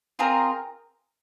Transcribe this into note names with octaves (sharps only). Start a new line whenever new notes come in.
C4 F4 G#4 A#4